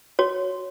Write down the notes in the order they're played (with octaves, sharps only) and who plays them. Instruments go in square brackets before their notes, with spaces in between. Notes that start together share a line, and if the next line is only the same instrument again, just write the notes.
[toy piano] F#4 C#5